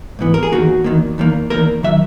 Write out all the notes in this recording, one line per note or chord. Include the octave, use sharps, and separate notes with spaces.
G#2 E3 B3
A#4
G#4
E2 D#3 A#3 F#4
E2 D#3 A#3
E2 D#3 A#3
E2 D#3 A#3 A#4
D#3 F#3 E5